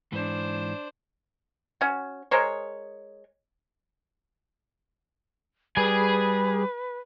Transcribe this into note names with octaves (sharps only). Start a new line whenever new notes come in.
G#2 E3 D4 C5
C#4 F#4
G#3 A#4 C5 C#5
G3 G#4 B4 G#5